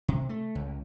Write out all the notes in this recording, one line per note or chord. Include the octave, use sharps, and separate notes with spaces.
C3
A3
C#2